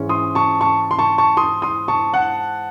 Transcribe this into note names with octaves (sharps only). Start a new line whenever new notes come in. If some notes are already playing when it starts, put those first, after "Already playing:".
Already playing: G#2 E3 G#3 C#4
C6 D#6
A5 C#6
A5 C#6
C6
A5 C#6
A5 C#6
C6 D#6
C6 D#6
A5 C#6
F#5 A5